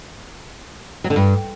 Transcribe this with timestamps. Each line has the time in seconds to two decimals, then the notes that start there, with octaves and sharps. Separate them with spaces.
1.04 F#3
1.10 D3
1.16 G2